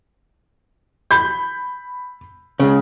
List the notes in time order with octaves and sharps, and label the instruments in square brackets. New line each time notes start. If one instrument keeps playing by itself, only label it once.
[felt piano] B5 G6
[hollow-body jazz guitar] C#2 C#3